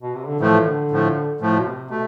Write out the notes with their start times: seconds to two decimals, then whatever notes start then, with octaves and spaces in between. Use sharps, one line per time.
0.02 B2
0.15 C3
0.27 D3
0.40 A2 E3 F3 A3
0.66 D3
0.91 A2 F3 A3
1.41 A2 F3 A3
1.57 B2
1.65 C3
1.90 B2 A3